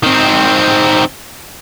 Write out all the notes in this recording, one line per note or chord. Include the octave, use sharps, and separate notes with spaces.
D#3 C4